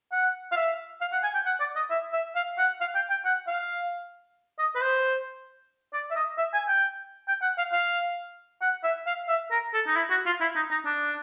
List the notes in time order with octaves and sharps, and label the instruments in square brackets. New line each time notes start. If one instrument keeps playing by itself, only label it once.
[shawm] F#5
F5
E5
F5
F#5
G#5
G5
F#5
D5
D#5
E5
E5
F5
F#5
F5
G5
G5
F#5
F5
D#5
B4
C5
D5
E5
D#5
E5
G#5
G5
G5
F#5
F5
F5
F#5
E5
F5
E5
A#4
A4
D#4
E4
F#4
F4
E4
D#4
D#4
D4